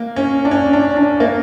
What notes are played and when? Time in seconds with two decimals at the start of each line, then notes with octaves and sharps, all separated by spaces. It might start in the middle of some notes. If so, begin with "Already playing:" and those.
Already playing: A#3
0.16 C#4
0.45 D4
0.51 C#4
0.73 D4
0.97 D4
1.20 A#3